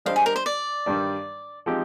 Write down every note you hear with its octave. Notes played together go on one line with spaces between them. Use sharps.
G3 D4 G4 C5 D#5 F5
G#4
A#4
C5
D5
G2 D#3 G3 D4
F3 G#3 C4 D#4 G4